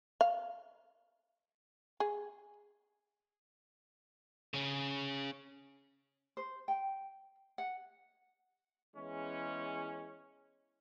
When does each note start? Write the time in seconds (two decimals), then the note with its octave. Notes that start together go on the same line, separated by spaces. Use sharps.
0.21 F5
2.00 G#4
4.54 C#3 C#4
6.37 C5
6.68 G5
7.58 F#5
8.96 E2 E3 G#3 C#4